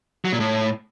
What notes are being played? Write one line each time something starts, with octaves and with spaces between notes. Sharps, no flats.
F#3
A#2
A2